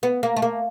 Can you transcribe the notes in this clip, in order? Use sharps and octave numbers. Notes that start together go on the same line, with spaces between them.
B3
A#3
A3
A#3